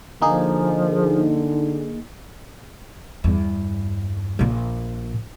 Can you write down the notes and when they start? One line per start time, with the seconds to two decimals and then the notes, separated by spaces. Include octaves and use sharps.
0.22 D3 F3 A#3 D#4 G#4
3.24 E2 G2
4.39 A#1 A#2